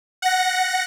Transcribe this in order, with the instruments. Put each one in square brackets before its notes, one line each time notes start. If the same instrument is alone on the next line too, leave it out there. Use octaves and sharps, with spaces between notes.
[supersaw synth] F#5 A#6